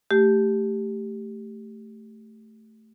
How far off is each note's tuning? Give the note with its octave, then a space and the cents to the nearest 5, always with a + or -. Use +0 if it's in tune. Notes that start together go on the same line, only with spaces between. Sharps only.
A3 +0 G4 +0